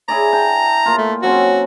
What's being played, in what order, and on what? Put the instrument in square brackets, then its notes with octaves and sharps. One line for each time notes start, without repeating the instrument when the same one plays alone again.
[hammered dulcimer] E4 G#4 D5 [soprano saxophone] A#5
[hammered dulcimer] G5 A5
A#3 F4
[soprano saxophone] A3
[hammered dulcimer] F#3 C4 C#4 [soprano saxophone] F#4